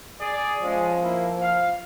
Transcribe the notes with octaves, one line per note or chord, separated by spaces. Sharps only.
G#4 D5
F3 G#3 C#4
A#3 E4
F5